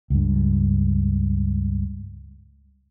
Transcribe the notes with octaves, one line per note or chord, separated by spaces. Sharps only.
C#2 G2